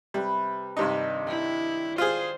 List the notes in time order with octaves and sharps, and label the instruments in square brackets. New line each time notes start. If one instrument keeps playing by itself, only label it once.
[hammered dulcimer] C3 B4 [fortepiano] G3
[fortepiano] G2 C3 D#4 [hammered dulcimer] D#3 D4
[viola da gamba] E4 [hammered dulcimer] G5
[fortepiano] F4 G#4 [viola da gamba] C5